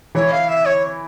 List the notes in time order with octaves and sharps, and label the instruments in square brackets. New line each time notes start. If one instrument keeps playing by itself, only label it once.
[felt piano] E3 E4 [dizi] C#5
[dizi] F5
E5
C#5